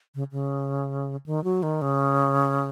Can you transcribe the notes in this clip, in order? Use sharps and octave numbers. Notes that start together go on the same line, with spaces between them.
C#3
C#3
D#3
F#3
D#3
C#3